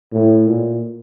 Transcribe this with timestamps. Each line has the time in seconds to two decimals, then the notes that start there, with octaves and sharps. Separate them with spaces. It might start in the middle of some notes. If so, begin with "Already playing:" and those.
0.13 A2
0.47 A#2